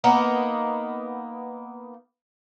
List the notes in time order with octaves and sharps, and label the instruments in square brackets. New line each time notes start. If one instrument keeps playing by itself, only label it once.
[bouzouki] A#3 B3 D#4